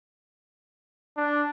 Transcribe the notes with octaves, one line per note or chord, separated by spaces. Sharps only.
D4